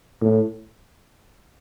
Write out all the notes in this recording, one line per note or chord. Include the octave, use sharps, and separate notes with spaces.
A2